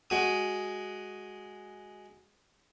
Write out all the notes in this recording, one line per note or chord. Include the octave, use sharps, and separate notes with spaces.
G#3 F#4 D#6